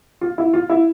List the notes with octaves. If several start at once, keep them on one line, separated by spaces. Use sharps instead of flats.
F4
E4
F4
E4